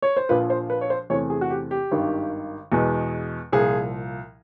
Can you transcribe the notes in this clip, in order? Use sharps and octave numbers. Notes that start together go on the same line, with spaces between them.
C#5
C5
A#1 A#2 F3 B4
C5
B4
C#5
C5
E2 C3 E3 A3 C4 C#5
G#4
F#4
G4
G4
G#1 G2 D#3
E2 B2 G#3 B3
C2 A#2 F3 G#4